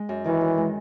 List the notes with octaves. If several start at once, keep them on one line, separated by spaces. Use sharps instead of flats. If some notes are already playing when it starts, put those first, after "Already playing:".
Already playing: G#3
F#2
D#3 E3
F#2
G#3